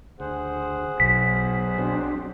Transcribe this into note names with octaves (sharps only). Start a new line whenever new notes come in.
D2 G#4 C5 F#5
B1 B2 B6
F#3 C4 D4